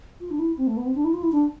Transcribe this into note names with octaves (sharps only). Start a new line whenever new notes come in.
F4
D4
E4
C4
A3
B3
C4
D4
E4
F4
E4
D4